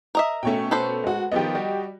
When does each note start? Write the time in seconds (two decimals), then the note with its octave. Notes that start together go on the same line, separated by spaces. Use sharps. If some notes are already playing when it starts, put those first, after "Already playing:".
0.15 A#4 D#5 E5
0.43 B2 A3 C#4 C#5 G5
0.71 A4 B4 C5
1.04 G#3 F#4
1.32 D#3 F3 B3 G4 D#5
1.55 G3 F#4